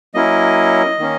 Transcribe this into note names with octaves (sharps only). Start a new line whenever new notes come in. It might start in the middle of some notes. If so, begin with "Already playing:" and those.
F#3 A#3 C#4 E4 D#5
D#3 A#3 C#4